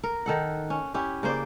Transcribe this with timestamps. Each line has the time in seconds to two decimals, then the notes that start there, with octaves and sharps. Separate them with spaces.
0.04 A#4
0.26 D#3 A4 F#5
0.70 C#4
0.94 C#4 E4 G4
1.23 C#3 A#3 C5 D5